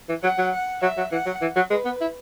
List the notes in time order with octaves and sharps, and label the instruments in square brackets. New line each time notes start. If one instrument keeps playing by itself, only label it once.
[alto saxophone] E3
[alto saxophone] F#3 [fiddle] F#5
[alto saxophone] F#3
[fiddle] F#5
[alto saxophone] F#3 [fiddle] E5
[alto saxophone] F#3
[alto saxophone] E3 [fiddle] F#5
[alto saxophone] F#3
E3
F#3
[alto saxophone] G#3 [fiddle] B4
[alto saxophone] B3
E4